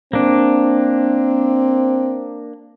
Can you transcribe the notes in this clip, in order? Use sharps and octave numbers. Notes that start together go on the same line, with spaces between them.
A#3 C4 D4